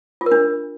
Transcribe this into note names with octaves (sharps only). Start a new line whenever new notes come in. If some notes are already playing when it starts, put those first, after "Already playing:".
F4
A#4
D4